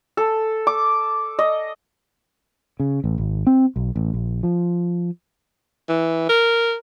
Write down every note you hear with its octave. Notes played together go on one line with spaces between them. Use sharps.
A4
D6
D#5
C#3
A1
G#1
C4
B1
A1
A#1
F3
E3
A#4